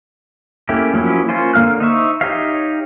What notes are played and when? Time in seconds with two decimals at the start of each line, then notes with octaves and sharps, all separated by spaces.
0.69 A3 A#3 C#4 E4 G4
0.94 F3 F#3 A#3 C#4 E4
1.29 A#3 C#4 F4 C5
1.54 D3 A#3 F5 F6 F#6
1.80 D#4 C5 E5 C#6
2.21 D#4 G4 C#5 E5 F5